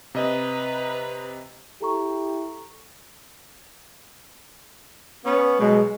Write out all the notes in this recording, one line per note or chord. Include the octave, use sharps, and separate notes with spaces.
C3 B4 D#5 A#5
E4 G4 A4 A#5 C#6
B3 C#4
B2 F#3 G#3